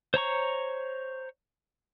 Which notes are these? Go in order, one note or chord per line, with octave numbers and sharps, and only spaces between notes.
C5 C#5 A#5 C#6